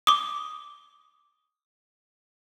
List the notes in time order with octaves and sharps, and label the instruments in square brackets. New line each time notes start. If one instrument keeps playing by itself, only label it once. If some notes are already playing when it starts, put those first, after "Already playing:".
[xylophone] D6 D#6